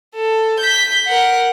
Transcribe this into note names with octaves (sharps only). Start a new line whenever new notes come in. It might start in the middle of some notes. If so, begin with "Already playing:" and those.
A4
G6 B6
A#4 F#5